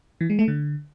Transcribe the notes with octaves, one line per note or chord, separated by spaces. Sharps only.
E3
G#3
A3
D3